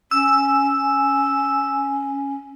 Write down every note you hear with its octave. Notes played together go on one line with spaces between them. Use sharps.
C#4 E6